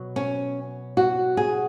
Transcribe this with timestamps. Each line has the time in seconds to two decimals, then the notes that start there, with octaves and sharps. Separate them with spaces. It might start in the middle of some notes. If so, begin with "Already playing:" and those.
Already playing: B2 F#3
0.16 C#4
0.97 F#4
1.37 G#4